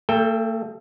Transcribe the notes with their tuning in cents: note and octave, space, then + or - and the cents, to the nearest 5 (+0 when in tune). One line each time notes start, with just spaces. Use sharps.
A3 +45 A4 -10 G5 +15